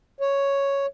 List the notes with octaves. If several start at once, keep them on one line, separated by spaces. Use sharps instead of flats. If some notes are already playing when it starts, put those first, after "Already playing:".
C#5